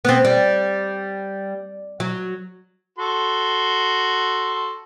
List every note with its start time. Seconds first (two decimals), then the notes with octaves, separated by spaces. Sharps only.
0.05 B3 C4
0.25 G3
2.00 F#3
2.98 F#4 A4 C6